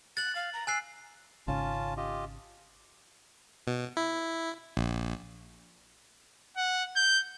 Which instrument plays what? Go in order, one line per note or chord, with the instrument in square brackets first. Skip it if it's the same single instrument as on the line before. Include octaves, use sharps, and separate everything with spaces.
[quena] F#6 [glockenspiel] A6 F#7
[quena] F5
A#5
[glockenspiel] G#5 F#6 C7 [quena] E6
[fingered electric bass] G#1 C#3 [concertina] C#4 F4 A5
[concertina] F4 G4 D#5
[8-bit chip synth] B2
E4
A#1
[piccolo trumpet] F#5
G6